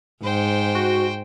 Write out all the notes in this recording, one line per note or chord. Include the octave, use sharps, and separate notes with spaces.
G#2 C5 G5
F#4